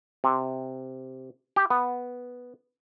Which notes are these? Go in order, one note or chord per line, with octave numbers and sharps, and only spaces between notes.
C3
G4
B3